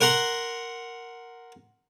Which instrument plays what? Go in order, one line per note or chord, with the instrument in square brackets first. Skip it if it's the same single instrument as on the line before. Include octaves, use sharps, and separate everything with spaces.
[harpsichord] A#4 F#5 A#5 C6